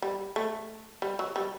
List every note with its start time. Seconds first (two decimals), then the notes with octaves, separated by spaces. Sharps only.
0.02 G3
0.36 A3
1.02 G3
1.19 F#3
1.36 G3